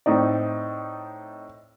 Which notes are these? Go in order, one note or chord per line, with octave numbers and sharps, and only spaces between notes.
A2 C4 D#4 D5